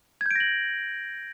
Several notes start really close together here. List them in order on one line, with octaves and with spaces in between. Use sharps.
G#6 G6 D7 A#6 F#7